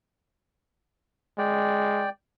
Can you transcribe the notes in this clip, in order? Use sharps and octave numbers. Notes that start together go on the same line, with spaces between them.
G#3 D5 G5